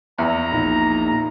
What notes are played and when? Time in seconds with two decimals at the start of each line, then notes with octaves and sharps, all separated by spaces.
0.19 E2 E5 A#5
0.53 A#1 A#2 D#4